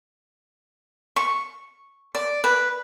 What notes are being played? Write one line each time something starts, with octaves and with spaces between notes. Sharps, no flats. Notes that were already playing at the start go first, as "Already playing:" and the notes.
C#6
D5
B4